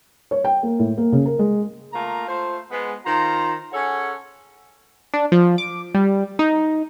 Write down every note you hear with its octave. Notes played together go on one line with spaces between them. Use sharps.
C#5
G5
A#3
A2
A#3
C#3
A#4
G#3
A3 A#3 F4 A#5
A3 F4 C5
G#3 B3
D#3 F4 C5 A#5
C#4 G#4 A4 C#5 F#5
D4
F3
D6
G3
D#4